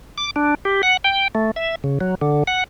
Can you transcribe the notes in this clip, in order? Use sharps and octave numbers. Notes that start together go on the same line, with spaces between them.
D6
D4
G4
F#5
G5
A3
E5
C#3
F#3
D3
F#5